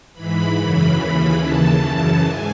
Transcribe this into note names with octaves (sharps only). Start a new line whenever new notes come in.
G#2 E3 B5
F#2 C#3 E3
D#2 C#3 E3
D#2 C#3 E3 A5
F#2 C#3 E3
G#2 G#5